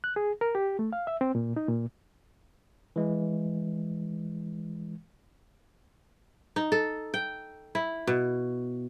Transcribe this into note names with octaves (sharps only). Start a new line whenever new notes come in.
F#6
G#4
A#4
G4
A3
F5
E5
C4
A#2
D#4
A#2
E3 G#3
D#4
A4
G5
E4
B2